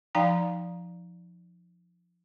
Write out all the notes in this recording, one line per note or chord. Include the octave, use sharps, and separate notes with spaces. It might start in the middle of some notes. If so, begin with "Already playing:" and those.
F3 D#4 D5 F5 G5 A#5